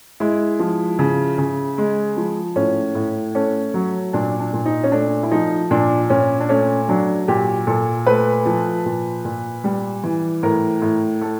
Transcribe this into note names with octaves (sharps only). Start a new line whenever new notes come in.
G#3 E4
F3
C#3
C#3
G#3
F3
A2 C#4
A2
A3 C#4
F#3
A#2 D4
D4
A#2
D#4
C#4
A3 D4
E4
F3 D#4
A#2 D4
A#2 C#4
D4
A3 C#4
F#3 D4
A#2 G4
A#2 A4
A3 B4
F3
A#2
A#2
G3
E3
A2 A#4
A2
A3 A4